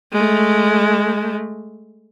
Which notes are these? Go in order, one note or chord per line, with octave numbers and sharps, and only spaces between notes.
G#3 A3